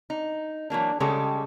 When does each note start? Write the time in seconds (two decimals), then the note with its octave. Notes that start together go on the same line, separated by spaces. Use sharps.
0.10 D#4
0.70 E3 F#3 A#3 D4
1.00 C#3 G3 G#3 G4 A4